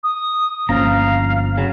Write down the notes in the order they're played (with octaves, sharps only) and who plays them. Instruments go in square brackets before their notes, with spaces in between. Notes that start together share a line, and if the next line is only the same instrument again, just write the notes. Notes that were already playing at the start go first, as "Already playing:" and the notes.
[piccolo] D#6
[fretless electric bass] G1 A#3 C#4 [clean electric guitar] F3 A#5 [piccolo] F5
[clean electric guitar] C#3 F#3